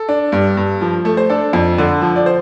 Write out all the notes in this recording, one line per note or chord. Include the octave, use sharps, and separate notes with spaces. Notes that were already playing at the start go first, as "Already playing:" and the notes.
Already playing: A4
D4
G2
G2
F3
A3
C5
D4 A4
F2
D3
F3
D5
C5